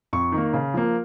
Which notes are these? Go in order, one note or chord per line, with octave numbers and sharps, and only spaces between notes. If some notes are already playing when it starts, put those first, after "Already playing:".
F2 C#6
D#3
A#3
C#3
F3 A#3